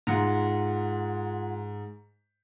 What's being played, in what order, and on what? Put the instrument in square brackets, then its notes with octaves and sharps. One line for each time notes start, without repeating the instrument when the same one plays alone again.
[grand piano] G#2 [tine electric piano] F4 F#5 A#5